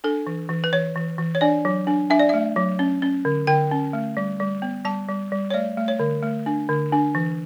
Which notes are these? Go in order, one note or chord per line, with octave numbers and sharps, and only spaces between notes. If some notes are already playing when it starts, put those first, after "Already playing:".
D4 A4
E3
E3
B4
E3 C#5
E3
E3
C#5
D4 D5
F#3
D4
D4 E5
D5
A3 E5
F#3
C#4
C#4
D3
D3 G5
C#4
A3
G3
G3
B3
G3 A5
G3
G3
C#5
A3 D5
A3
C#5
D3
A3
D4
D3
D4
E3